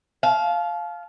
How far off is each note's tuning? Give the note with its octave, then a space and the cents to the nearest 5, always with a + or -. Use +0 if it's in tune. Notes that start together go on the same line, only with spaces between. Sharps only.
F5 +0 A5 -35